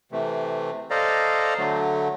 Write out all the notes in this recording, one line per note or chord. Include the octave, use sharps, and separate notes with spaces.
C3 E3 A3
A4 C5 D5 D#5 F5 A#5
D3 F#3 A3